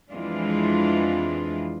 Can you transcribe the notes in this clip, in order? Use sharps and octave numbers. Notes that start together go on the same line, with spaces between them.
F2 E3 G#3 D4 F4